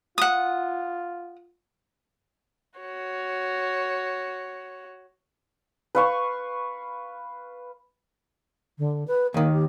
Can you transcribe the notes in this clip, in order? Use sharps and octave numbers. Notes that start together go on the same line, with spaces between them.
F4 F#5 D#6
F#4 C#5
B4 F5 C#6
D3
B4
D#2 D#3 A#3
G4